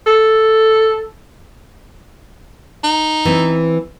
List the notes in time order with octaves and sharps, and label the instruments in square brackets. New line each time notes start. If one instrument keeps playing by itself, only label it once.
[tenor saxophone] A4
[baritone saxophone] D#4
[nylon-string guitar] E3 C4